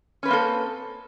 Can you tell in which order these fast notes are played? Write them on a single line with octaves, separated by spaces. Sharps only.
C#4 B4 C4 A#3 A4